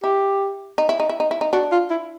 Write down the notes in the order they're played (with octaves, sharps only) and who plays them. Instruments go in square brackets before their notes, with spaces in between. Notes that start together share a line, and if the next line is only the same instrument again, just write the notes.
[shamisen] E4 [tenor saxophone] G4
[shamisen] D#4
E4
D#4
E4
D#4
E4
D#4
[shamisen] D4 [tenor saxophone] F#4
[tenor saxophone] F4
E4